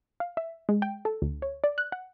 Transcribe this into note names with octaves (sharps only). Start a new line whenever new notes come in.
F5
E5
G#3
G5
A4
D2
C#5
D5
F#6
F#5